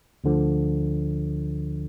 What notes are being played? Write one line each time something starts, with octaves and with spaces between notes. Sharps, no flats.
D2 D3 F3